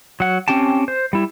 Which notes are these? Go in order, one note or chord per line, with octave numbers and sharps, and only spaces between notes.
F#3 F#5
C4 C#4 G4 G5 A5
C5
G3 E4